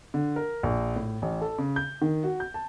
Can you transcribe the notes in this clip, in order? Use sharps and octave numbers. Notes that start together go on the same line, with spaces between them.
D3
A#4
A#1
A2
A1
A4
C#3
G6
D#3
F#4
G6
A5